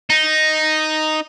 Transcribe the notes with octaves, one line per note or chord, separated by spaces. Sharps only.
D#4